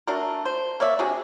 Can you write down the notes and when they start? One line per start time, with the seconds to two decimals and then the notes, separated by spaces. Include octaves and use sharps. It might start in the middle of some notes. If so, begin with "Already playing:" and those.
0.07 A3 D4 F#4 A#4
0.45 C5
0.80 A#3 C#5 D5 E5
0.99 C3 D4 F#4 G#4